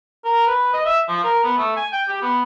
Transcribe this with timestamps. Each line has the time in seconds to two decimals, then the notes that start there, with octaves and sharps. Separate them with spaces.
0.25 A#4
0.47 B4
0.74 D#5
0.86 E5
1.09 F3
1.24 A#4
1.44 B3
1.58 A3
1.77 G#5
1.93 G5
2.08 G4
2.22 B3